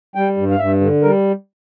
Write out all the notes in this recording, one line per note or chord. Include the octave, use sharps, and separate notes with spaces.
G3 G5
G2
F5
G2 E5
D3
G3 A#4